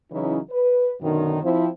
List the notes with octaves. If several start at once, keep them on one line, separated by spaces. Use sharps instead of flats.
C#3 E3 F#3 C#4 D#4 E4
B4
F#2 B2 D3 D#3
F3 C4 E4